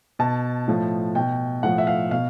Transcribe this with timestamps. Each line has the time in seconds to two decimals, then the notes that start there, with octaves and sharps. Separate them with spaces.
0.19 B2 A5
0.68 A2 F3
1.15 B2 G5
1.63 A2 F3 F#5
1.78 E5
1.87 F5
2.11 B2 F5